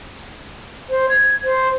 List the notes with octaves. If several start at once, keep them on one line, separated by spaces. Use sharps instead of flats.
C5
G#6
C5